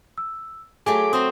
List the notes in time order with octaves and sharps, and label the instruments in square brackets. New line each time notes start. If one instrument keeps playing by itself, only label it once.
[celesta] E6
[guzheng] F#3 A3 G4 [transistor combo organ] G#4 D6 [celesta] G#5
[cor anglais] C4 [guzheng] F#4 C5 [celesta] D#6